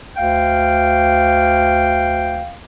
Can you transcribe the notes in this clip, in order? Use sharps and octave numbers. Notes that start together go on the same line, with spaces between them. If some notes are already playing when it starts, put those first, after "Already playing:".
D2 F5 G5